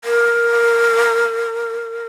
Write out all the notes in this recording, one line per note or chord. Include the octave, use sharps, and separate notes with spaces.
A#4